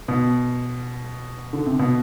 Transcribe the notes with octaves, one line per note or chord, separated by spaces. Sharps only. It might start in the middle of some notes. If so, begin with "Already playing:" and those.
B2
D3
C3
B2